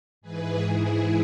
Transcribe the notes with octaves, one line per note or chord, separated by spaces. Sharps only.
G#2 E3 G#4 B4
G#2 E3 E4 G#4